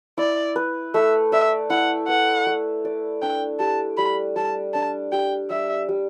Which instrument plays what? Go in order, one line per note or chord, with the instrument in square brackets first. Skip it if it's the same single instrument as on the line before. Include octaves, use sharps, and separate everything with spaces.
[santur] E4 [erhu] D5
[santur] B4
[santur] A3 [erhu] E5
[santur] D5 [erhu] E5
[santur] E4 [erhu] F#5
[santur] B4 [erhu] F#5
[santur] A3
D5
[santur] D4 [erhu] G5
[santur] G4 [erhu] A5
[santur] G3 [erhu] B5
[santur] G3 [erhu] A5
[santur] D4 [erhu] A5
[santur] G4 [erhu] G5
[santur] G3 [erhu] E5
[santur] G3